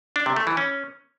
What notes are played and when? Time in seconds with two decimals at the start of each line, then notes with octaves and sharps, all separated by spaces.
0.16 D4
0.26 C3
0.36 A3
0.47 E3
0.57 C#4